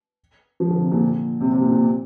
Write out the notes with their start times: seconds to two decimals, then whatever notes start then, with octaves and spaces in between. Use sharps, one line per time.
0.60 F3
0.71 D3
0.81 C3
0.91 A#2 D3
1.41 C3
1.51 C3
1.61 A#2
1.71 A#2